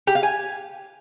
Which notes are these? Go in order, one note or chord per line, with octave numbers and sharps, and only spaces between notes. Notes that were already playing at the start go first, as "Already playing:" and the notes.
G4
F5
G#5